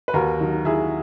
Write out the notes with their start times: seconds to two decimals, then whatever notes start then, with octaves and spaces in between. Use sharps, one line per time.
0.08 B4
0.14 D#2 F#4 A#4
0.40 D#3 F#3
0.65 D#2 E4 G#4